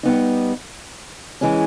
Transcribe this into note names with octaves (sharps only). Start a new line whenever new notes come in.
G3 B3 D#4
E3 G#3 C#4